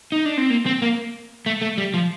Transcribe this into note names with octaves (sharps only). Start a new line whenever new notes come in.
D#4
D4
C4
A#3
C4
A#3
A3
A3
G3
F3